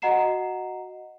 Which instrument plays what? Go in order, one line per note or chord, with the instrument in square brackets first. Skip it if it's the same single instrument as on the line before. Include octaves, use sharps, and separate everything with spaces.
[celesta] F#4 D#5 F#5 A#5 C7 E7